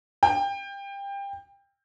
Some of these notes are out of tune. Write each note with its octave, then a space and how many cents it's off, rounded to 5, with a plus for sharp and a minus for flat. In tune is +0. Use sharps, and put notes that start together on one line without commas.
G5 +25